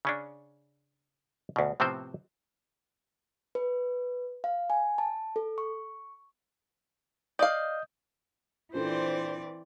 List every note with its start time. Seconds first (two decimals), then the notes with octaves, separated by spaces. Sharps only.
0.05 C#3 C#4 D4
1.56 D2 B2
1.80 A2 C3 F3 B3 C4 C5
3.55 B4
4.44 F5
4.70 G#5
4.98 A5
5.36 A4
5.58 C#6
7.39 D5 D#5 F5 D#6 G6
8.74 A#2 E3 C4 D4 A4 C5 D5